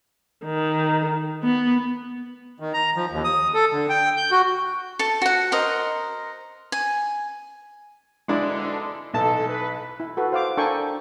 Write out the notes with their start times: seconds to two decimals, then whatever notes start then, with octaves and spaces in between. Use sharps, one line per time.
0.45 D#3
1.43 B3
2.60 D#3
2.74 A#5
2.96 F3
3.11 D#2
3.24 D#6
3.54 A4
3.72 D3
3.89 G5
4.17 G6
4.31 F#4
4.99 A4 A5
5.22 F#4 F#5
5.52 A#4 C5 D#5
6.72 G#5
8.28 G#2 B2 D3 G#3 D4 E4
9.14 B1 E3 A4 A5
9.48 B4
10.00 E4
10.17 F#4 A4 B4
10.32 C5 F5 D6
10.57 D4 A4 A#4 G5 G#5 C#6